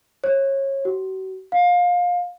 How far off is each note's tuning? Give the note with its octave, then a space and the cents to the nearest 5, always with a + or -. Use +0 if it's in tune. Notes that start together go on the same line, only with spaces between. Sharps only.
C#5 -25
F#4 +40
F5 +25